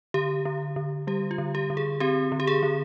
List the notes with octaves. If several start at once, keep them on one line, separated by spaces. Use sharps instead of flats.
D3 G4
D3
D3
G3 G4
F4
D3
G4
D3
G#4
C4 G4
D3
G4
G#4
D3